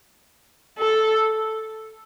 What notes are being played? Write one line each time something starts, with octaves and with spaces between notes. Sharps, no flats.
A4